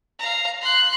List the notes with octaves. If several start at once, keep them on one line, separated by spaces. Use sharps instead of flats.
F5 A#5
C6 F#6